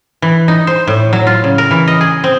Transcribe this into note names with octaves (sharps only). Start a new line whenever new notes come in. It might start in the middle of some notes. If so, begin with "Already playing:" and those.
E3
D#4
C5
A2
F#3
F4
C#3
A#4
E3
D#5
G#4
C4